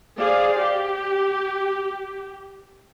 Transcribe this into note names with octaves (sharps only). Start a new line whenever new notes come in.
G#4 C5 D5 F5
G4